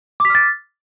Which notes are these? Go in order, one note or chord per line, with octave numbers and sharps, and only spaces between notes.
D6 F6 A6 B6